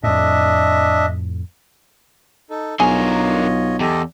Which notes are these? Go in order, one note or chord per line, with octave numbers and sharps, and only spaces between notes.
F2 A2 D4 D#5 E5
D#4 A4
B1 D3 F4 G#4 A#4 C#5 D#5
E2 G4 A4 D#5